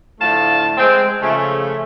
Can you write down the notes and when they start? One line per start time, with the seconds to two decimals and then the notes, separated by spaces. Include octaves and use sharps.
0.21 A2 D3 F3 A3 F5 A5
0.77 G#3 C4
1.21 C#3 F3 A3